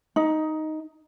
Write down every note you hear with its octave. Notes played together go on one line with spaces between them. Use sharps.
D#4